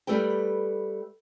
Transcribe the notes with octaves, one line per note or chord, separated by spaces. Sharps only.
G3 A3 B4 G5